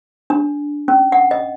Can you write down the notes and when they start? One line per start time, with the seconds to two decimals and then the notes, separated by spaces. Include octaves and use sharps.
0.30 D4
0.88 C#4
1.12 F#5
1.31 D#5